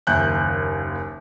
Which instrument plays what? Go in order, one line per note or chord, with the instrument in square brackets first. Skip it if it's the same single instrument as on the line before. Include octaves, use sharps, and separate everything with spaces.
[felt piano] F#1 D#2 G#5 F#6 G6